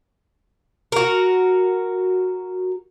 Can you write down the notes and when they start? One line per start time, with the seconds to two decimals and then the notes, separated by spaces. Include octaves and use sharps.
0.92 F#4 A#4